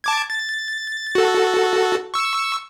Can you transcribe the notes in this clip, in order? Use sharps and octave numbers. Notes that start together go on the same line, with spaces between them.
A5 D6 G#6
A6
F#4 A4
C#6 E6